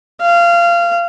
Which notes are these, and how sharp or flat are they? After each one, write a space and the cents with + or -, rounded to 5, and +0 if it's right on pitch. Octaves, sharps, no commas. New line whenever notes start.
F5 -20